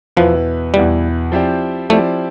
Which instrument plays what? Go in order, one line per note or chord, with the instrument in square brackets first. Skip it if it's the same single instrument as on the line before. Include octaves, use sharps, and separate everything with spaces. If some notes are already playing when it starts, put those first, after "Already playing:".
[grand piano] E2 B2 B3 E4 B4 [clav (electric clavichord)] F3
[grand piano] E2 B2 B3 E4 B4 [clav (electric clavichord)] G3
[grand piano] F3 C4 E4 G4 D5
[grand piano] F3 C4 E4 G4 D5 [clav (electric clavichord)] A3